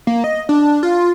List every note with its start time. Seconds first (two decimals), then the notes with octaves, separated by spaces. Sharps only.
0.07 A#3
0.24 D#5
0.49 D4
0.83 F4